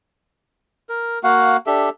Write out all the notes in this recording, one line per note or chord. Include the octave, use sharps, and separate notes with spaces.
A#4
A#3 F#4 F5 F#5
D4 G4 A4 E5